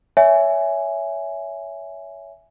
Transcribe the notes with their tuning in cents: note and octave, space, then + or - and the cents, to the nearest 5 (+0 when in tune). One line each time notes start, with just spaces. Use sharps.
C#5 +20 E5 +0 G#5 +0